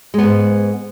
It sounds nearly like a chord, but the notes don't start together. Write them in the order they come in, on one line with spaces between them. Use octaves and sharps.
G#3 B3 G#2